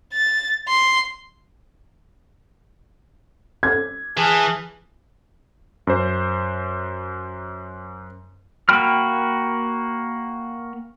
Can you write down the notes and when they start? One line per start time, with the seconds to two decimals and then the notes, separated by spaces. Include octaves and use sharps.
0.13 A6
0.69 C6
3.63 G#6
4.17 E3 G#4 A5 F6 F#6
5.87 F#2 C5
8.69 A#3 F#4 G5 B5 F6